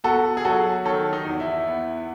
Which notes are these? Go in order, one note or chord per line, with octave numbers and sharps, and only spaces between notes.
B3 F#4 A4
G#4
F#3 F#4 A4
D#3 A4 C#5
D#4
E2
E4
B3